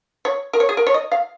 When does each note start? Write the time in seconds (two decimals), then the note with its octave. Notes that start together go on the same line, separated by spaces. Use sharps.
0.25 C#5
0.53 A#4
0.60 C#5
0.69 G#4
0.77 A#4
0.87 C#5
0.94 D#5
1.12 F5